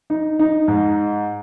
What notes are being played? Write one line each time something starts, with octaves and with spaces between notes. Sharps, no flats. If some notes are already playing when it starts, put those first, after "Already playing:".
D#4
D#4
G#2